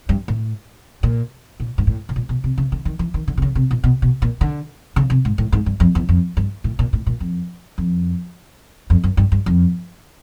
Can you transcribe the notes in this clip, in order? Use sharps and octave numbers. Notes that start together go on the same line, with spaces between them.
G2
A2
A#2
A#2
G#2
A2
B2
A#2
B2
C3
C#3
D3
D#3
E3
D#3
D3
C3
C#3
C3
A#2
B2
B2
A#2
D3
C#3
C3
G#2
A2
G#2
G2
F2
E2
F2
G2
A2
A#2
A2
A#2
F2
F2
F2
F#2
G2
G2
F2